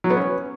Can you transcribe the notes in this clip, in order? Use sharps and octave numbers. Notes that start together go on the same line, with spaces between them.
F#3
B3
C#4